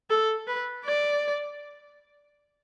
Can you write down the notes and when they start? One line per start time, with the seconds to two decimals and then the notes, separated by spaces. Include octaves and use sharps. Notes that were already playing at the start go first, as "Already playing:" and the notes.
0.10 A4
0.47 B4
0.85 D5